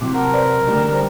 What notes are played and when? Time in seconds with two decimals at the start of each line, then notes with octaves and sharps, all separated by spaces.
0.01 C3 F#3 E4 D6
0.15 A#4 F#5 A5
0.34 B4 C5 D5
0.67 D2 G3 D4
0.93 C5